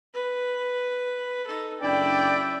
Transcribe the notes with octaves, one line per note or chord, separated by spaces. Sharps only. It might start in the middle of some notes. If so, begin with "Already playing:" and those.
B4
D#4 A4
F#1 C#4 D4 E4 D5 G5